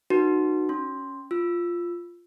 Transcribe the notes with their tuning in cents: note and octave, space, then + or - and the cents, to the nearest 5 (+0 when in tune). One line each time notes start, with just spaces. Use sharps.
D#4 -25 F#4 +0 B4 -35
C#4 +0 C6 +0
F4 +0 E6 +10